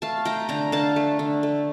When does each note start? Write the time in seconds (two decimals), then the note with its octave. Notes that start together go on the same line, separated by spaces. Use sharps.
0.02 A3 F5 A5
0.25 A3 G5 A#5
0.49 D3 G5 A#5
0.72 D3 F5 A5
0.96 A3
1.19 D3
1.43 A3